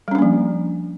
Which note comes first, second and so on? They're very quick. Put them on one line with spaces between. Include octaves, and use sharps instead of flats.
G3 C#4 D4 A#3 F3